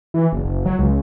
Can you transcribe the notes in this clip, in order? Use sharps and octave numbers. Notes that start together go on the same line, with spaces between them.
E3
F#1
F#1
F#3
C#2